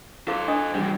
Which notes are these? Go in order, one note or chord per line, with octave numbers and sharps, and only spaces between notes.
E4 A4 C5 F5 D6
D4 D#5 D#6
E3 G3 C#4